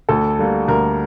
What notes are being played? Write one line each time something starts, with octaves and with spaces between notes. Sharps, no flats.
D2 A4
D3 G3 A#3
D2 A#4